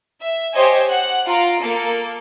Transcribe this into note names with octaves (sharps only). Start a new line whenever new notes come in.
E5
G4 C5 C#5 D#5 G#5
F#5
F4 F5 A#5 D7
A#3 A4